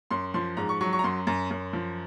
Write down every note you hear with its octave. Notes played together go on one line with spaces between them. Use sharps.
F#2 C6
F3 C6
G#2 A#5
C#6
F#3 C#6
C#6
A#5
F#2 C6
F#2
F#2
F3